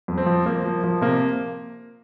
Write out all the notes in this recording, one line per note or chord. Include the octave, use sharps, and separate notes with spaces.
F2
C4
F3
F3 A#3
F3
F3
C3 A#3